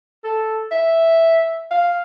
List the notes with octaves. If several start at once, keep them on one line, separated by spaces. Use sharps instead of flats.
A4
E5
F5